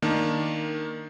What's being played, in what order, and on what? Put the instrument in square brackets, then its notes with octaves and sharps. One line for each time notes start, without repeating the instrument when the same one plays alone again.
[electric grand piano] D#3 A#3 D4